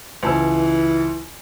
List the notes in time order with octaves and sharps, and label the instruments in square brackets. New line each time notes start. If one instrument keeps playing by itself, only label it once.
[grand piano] C#2 A5 E6 [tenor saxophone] E3